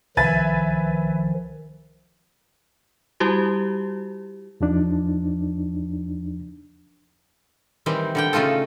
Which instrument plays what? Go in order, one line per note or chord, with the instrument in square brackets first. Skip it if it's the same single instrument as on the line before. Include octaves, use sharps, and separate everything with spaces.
[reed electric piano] C2 A6 [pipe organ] D#3 F3 [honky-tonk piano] B4 E5 G#5
[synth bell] G3 E4 F#4 G4
[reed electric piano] E2 F3 D4 D#4
[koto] D#3 E3 G3 C4
D3 G3 G5
C#3 A3 D#4 F4 A4